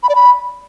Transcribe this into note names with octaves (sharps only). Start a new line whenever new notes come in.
B5
D5
B5